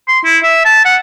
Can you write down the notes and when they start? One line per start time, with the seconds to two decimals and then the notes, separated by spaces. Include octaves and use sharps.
0.08 C6
0.24 E4
0.44 E5
0.65 A5
0.85 F#5